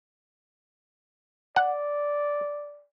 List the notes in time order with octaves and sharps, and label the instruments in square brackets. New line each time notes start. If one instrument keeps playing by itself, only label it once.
[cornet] D5 [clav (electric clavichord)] F#5